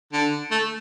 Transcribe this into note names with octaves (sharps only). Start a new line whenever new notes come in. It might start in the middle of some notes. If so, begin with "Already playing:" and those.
D3
A3